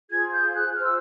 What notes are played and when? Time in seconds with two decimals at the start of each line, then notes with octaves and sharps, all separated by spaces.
0.10 F4 G#4 C5 G#6
0.32 G6
0.54 F#6
0.76 F4 G#4 C5 F6
0.85 E6